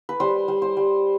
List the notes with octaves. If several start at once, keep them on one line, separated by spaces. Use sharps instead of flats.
B4
G3 C5
G3
C5
G3